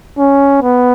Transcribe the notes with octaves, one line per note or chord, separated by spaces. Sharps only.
C#4
B3